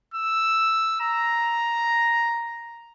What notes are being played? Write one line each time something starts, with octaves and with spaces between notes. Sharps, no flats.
E6
A#5